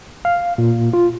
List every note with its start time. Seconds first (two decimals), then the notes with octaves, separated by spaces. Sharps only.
0.25 F5
0.58 A#2
0.93 F4